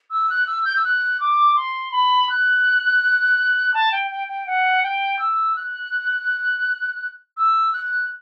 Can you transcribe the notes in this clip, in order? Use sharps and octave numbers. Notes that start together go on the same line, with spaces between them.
E6
F#6
E6
G6
E6
F#6
D6
C6
B5
F#6
A5
G5
G5
G5
F#5
G5
E6
F#6
E6
F#6